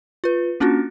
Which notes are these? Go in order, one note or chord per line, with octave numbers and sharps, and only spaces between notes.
F4 B4
A#3 C#4 D4 F4 F#4